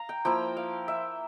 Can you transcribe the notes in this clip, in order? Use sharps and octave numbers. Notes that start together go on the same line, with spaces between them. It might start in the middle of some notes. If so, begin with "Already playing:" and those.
Already playing: F5 A#5
G5
F3 A#3 E4 G5
F5
E5